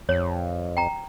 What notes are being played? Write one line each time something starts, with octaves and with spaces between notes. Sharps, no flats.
F2 C#5
G5 A#5